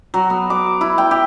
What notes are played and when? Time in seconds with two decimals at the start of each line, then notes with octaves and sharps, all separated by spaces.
0.14 F#3
0.30 B3
0.50 D6
0.81 E4
0.98 G5
1.11 G4